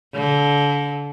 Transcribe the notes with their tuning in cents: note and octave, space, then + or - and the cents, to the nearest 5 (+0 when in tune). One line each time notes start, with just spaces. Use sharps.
D3 -35